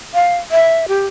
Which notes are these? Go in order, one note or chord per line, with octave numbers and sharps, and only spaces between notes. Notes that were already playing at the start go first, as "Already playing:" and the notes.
F5
E5
G4